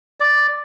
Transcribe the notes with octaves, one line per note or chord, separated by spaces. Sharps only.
D5